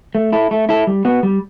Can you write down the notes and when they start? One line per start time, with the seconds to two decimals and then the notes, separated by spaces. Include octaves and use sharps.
0.15 A3
0.32 E4 A4
0.51 A3
0.69 E4 A4
0.87 G3
1.05 B3 F#4
1.23 G3